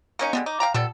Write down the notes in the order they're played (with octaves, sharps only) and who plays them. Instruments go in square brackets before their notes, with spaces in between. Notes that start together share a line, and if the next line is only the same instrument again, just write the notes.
[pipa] A#3 C#4 D#4 [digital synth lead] C#7
[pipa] D3 G3 G#3 [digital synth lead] B3
[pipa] D#4 [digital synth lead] D6
[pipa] F5 G5 A#5
[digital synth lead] A#2 [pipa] G3 B3 A4